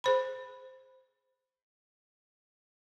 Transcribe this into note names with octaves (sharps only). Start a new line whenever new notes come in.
G#4 C5 B5